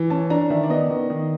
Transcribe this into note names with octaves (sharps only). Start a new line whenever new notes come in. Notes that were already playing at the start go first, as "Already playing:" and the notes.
Already playing: E3
C#4 A5
D4 A#5
D#3 E5
D5
B3 D#5
D#3
D#3